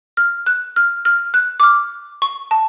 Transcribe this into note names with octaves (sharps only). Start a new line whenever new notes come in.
F6
F#6
F6
F6
F#6
D6
F6
C#6
A5